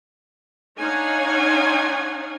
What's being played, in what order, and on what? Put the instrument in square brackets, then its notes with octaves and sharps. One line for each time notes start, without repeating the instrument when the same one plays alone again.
[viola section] D4 D#4 C#5 F5 F#5 G#5